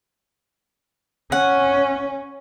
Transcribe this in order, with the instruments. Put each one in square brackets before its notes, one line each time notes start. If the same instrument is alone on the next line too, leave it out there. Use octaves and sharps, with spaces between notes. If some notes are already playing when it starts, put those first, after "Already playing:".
[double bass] C#4 [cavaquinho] F#5